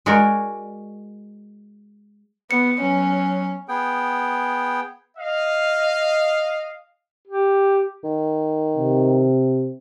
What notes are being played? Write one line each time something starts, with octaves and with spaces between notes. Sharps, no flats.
G#3 F#4 A#4 C#5 D5
B3 C#7
F#3 C#4
B3 G#4 G5
D#5 F5
G4
D#3
C3